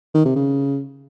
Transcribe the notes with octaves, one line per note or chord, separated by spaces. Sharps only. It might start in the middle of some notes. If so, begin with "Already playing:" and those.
D#3
C3
C#3